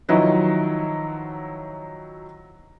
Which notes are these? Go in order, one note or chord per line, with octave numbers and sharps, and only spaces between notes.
D#3 F3 F#3 E4 B4 D#5